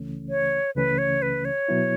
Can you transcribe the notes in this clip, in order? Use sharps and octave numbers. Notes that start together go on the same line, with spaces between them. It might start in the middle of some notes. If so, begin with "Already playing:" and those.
Already playing: C#2 C#3 E3 A3 C#4
C#5
C#2 C#3 E3 A3 C#4 B4
C#5
B4
C#5
B2 F#3 B3 E4